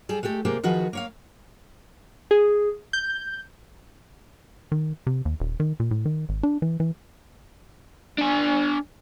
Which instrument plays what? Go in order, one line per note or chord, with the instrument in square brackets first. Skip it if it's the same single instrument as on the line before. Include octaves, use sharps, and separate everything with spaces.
[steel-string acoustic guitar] G3 G#4 A4
G#3 A3 G4 A4
C3 A#3 G4 G#4
D#3 F3 F#4 G#4 B4
A#3 C#5 F5
[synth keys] G#4
G6
[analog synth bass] D#3
C3
D#2
D#1
D#3
A#2
A2
D#3
G#1
D4
E3
E3
[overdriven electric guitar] D4 G#5